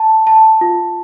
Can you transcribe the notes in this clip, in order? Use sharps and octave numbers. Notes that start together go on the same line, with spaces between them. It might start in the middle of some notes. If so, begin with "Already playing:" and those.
Already playing: A5
A5
F4